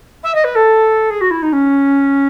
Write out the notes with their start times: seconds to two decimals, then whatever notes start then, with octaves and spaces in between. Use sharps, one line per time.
0.23 E5
0.34 D#5
0.44 B4
0.55 A4
1.10 G#4
1.21 F#4
1.30 E4
1.42 D#4
1.52 C#4